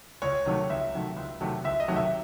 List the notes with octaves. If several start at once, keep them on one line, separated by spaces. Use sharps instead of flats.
C#2 C#5
C3 D#3 F#3 A3
C#2 E5
C3 D#3 F#3 A3
C#2
C3 D#3 F#3 A3
C#2 E5
D#5
C3 D#3 F#3 A3
E5